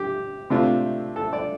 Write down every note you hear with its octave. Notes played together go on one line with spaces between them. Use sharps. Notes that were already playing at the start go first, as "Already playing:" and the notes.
Already playing: G4
C3 A3 D4 F4
A4
D5